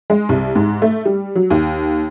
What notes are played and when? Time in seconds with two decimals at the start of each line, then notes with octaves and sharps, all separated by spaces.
0.10 G#3
0.29 C2
0.56 G#2
0.82 A3
1.05 G3
1.35 F#3
1.50 D#2